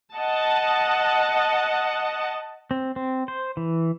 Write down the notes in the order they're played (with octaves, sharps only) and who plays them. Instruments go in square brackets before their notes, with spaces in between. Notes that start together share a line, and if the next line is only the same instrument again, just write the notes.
[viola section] D#5 F#5 A5
[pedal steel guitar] C4
C4
C5
E3